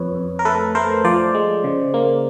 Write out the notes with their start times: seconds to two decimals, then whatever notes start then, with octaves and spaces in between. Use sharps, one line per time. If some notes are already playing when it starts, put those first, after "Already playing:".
Already playing: F2 B4 C#5
0.15 F2
0.39 A#4
0.45 A3 A4 B4
0.75 A3 A#4 C5
1.05 F3 C5 D5
1.35 G#3
1.64 C#3
1.94 A#3